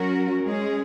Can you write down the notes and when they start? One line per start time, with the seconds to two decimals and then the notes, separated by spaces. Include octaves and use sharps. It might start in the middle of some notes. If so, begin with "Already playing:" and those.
Already playing: F#3 C#4 F#4 A#4
0.44 G#3 C#4 G#4